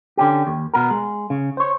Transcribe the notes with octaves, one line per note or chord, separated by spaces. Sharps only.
D3 C#4 G4
D#2
B2 B3 A#4
G#3
C#3
C5 C#5